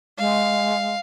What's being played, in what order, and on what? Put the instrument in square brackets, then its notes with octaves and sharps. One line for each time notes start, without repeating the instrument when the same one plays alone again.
[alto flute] G#3 [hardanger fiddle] F5